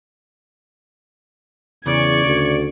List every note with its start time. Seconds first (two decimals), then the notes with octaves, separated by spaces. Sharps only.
1.86 E2 C#3 D5 C#6 G#6 D7
2.25 D2